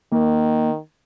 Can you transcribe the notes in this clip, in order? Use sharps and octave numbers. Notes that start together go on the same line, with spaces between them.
D#3 A#3